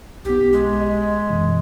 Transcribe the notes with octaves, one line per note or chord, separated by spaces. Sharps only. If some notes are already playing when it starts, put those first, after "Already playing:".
B1 B3 G4
G#3
D#5 B6
F#2 B2 E3